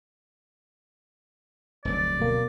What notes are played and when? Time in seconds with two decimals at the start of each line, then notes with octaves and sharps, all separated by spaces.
1.85 F1 D2 F#3 D5
2.19 B2 A#3